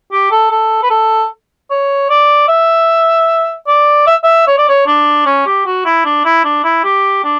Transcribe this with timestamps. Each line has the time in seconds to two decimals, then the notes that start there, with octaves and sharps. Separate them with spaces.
0.12 G4
0.31 A4
0.51 A4
0.83 B4
0.90 A4
1.70 C#5
2.09 D5
2.48 E5
3.67 D5
4.07 E5
4.24 E5
4.47 C#5
4.58 D5
4.69 C#5
4.87 D4
5.26 C#4
5.46 G4
5.66 F#4
5.85 E4
6.05 D4
6.25 E4
6.44 D4
6.64 E4
6.84 G4
7.24 D4